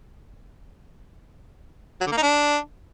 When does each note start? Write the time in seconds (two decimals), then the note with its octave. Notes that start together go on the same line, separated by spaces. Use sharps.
2.01 F#3
2.07 D3
2.12 A#3
2.17 D#4
2.22 D4